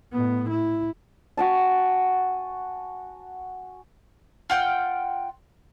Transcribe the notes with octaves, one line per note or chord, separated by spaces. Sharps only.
A2 B3
E4
F#4 G#5 A5
F4 F#5 G5 F6